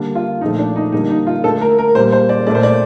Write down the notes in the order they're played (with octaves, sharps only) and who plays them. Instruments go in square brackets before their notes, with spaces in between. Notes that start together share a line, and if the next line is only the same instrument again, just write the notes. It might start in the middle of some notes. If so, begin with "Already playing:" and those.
Already playing: [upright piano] D3 G3 A#3
F4
A#2 F3 A3 D#4
D4
D#4
D3 G3 A#3 D#4
D#4
F4
D3 A3 A4
A#4
A#4
A#2 G3 A#3 C5
C5
D5
A#2 A3 D5
C5
D5